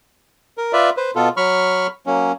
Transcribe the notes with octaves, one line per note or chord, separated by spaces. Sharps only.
A#4
F4 B4 D5 E5
B4 C5
B2 B3 F4 A4
F#3 B5 C#6 F6
F#3 A#3 C#4